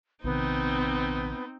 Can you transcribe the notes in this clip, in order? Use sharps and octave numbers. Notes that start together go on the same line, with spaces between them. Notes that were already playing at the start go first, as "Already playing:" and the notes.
A#1 C3 D#3 B3 C4 D#4